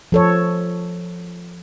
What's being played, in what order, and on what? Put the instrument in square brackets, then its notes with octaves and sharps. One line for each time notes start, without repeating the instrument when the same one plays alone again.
[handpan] F3 A4 C#5